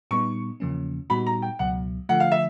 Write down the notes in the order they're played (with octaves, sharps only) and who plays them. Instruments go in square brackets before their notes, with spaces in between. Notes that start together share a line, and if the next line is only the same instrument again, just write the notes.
[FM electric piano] A#2 G3 B3 D#4 [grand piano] C#6
[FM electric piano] E2 C#3 F3 A#3 C#4
[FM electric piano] A#2 G3 B3 D#4 F#4 [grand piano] B5
[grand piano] A#5
G5
[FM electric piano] C#2 B2 F#3 [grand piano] F#5
[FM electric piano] D3 F3 A3 [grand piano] F#5
[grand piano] F5
E5